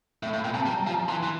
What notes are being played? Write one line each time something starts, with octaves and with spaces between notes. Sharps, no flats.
A2 E5
A2 F5
A#2 G5
C3 A5
G3 A#5
A#5
F3 A5
A5
E3 C6
E3